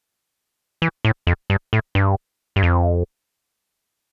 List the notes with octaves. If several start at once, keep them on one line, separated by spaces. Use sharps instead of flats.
E3
A2
F2
G2
A2
G2
G2
F2